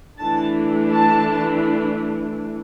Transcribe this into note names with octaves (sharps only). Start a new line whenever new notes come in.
E3 A3 D4 A5
A5